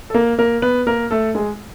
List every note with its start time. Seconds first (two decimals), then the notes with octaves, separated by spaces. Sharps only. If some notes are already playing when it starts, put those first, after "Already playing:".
0.10 A4
0.14 A#3 A#4
0.38 A#3 A#4
0.62 B3 B4
0.87 A#3 A#4
1.11 A3 A4
1.35 G#3 G#4